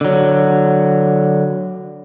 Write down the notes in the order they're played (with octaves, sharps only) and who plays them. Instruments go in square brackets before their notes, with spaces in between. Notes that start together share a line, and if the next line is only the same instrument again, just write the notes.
[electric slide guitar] D3 F#3